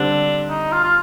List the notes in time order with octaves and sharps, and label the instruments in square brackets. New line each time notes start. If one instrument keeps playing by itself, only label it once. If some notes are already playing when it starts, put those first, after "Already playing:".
Already playing: [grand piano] D3 G3 C4 [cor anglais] D4
[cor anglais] D#4
F4
F4